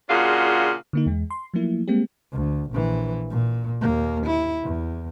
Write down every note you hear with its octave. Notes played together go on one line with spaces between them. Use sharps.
A#2 C#3 D4 F4 F#4 G#4
D3 A#3 D#4
E2 G#3
C6
F3 F#3 A3 A#3 E4
G3 G#3 A#3 C4 G4
D2
A#1 E3
A#2
D#2 A#3
E4
E2